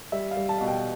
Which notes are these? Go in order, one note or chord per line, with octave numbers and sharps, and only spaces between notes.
G3 E5
F5
G3
A5
B2 F5
G5